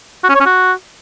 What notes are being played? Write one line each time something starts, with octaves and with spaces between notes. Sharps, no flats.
F#4
C#4
C#5
C#4
F#4